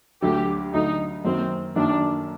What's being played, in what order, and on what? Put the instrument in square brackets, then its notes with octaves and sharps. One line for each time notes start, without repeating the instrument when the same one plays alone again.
[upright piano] D2 D3 F#3 [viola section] G4
[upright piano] D2 D3 F#3 [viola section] D#4
[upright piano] F#2 D#3 F#3 A#3 [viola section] C4
[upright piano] F#2 D#3 F#3 A#3 [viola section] D4